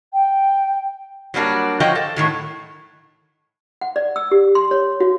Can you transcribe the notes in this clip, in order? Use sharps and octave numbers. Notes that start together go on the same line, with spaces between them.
G5
F#3 G3 A#3 D4 F#4
F3 F#3 F4 F#4 D#5 G5
A4
A2 D#3 F#3
F#5
D5
E6
G4
C6
C#5
F#4